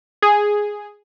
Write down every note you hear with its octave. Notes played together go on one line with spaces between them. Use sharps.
G#4